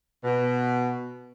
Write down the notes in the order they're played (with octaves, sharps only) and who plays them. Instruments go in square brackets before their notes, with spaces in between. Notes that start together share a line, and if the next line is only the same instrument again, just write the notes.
[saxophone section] B2